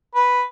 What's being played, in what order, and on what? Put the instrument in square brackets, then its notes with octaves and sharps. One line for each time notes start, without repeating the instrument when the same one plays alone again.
[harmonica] B4